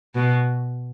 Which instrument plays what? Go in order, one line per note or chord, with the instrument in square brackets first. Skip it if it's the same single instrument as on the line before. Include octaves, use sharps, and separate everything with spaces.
[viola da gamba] B2